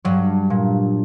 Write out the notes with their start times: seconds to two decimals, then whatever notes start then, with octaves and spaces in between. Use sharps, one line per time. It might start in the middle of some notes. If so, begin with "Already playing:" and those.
0.05 G2 F#3
0.50 A#2